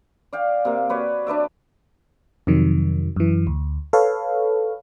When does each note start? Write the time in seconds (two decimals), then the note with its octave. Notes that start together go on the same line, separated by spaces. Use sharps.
0.33 D5 F5 G5
0.65 C3 A#3
0.89 F#4 B4 C#5 D5
1.27 D4 B4 D5 E5
2.47 F2 C3 D#3 F#3
3.16 F#2 E3
3.47 D2
3.93 A4 B4 C#5 F5